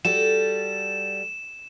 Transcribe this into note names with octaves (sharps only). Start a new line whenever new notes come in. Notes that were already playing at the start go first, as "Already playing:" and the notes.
G3 F#4 A4 E7